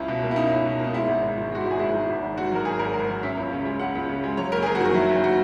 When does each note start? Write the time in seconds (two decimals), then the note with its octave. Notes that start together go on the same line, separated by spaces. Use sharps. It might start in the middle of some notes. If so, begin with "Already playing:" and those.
Already playing: C#2 C#4 E4
0.08 B2
0.22 A#3
0.31 E4
0.36 C#4 D#4
0.51 C#2
0.66 B2
0.79 A#3
0.84 D#4
0.93 G#3 E4
1.08 G#1
1.22 G#2
1.37 D#3
1.52 G#3 F#4
1.61 G#1 E4
1.71 G#4
1.79 G#2 E4
1.93 D#3
2.09 G#1
2.22 G#1
2.36 G#2 F#4
2.52 F#3 A#4
2.65 G#1 G#4
2.79 G#1 A#4
2.94 G#2 A#4
3.09 F#3
3.23 C#4 E5
3.37 C#2
3.52 C#3
3.65 G#3
3.80 C#4 F#5
3.95 C#2
4.09 C#3
4.24 G#3
4.37 F#3 C#5
4.52 F#1 A#4
4.63 G#4
4.66 F#2 A#4
4.75 F#4
4.80 D#3
4.85 F#4
4.94 F#3 E4
5.09 F#1
5.24 F#4